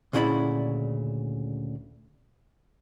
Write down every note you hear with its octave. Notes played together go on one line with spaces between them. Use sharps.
D2 A#2 C#3 E4 D5 B5